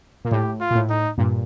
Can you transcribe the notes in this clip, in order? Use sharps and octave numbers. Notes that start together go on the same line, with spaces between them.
A#2
A2 G4
F4
A#2
A2
D#4
G2 A#2